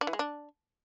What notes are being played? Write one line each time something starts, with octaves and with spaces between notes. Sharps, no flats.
D4
E3
G#3
D4